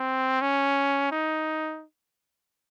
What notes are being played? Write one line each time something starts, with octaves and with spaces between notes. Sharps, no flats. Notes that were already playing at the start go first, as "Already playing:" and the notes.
Already playing: C4
C#4
D#4